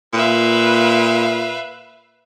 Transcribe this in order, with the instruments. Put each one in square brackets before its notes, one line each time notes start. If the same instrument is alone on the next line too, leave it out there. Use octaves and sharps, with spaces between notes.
[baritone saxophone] A#2 [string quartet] B4 E5 F5